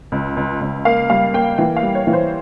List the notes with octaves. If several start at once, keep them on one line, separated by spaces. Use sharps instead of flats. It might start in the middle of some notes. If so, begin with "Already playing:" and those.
C#2
C#2
C#2
A#3 F5
G3 F5
A#3 G5
E3 G5
F5
G3
C#5
E3
C5